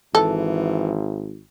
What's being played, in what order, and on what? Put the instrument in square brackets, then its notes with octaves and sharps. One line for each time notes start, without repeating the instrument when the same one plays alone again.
[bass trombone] G#1 [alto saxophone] E3 [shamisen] A4